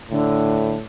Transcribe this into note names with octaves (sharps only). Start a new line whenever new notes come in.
A2 D3